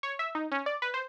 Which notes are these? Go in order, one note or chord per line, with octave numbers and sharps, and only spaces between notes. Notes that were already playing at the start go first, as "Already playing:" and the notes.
C#5
E5
D#4
C#4
D5
B4
C5